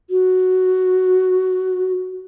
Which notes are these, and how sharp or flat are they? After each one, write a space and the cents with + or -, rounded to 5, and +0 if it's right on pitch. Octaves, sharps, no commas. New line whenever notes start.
F#4 +5